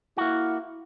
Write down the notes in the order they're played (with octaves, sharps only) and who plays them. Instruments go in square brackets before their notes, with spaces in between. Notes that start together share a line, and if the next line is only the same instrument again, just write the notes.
[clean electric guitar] A#3 F#4 [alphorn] E4